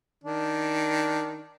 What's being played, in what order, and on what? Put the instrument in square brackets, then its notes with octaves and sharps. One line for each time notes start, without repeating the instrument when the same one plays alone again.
[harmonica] D#3 D4